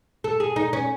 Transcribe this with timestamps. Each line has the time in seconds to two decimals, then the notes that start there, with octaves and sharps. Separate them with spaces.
0.24 A4
0.40 G#4
0.56 D#4
0.73 C#4